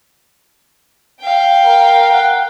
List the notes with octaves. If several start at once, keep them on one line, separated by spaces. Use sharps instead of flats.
F5 G5
A#4
F#5